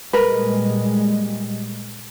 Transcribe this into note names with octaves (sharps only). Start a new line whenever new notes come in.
A#2 G3 G#3 A#4 B4